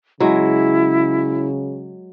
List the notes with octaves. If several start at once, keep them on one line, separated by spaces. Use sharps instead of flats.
C#3 F#3 G#3 E4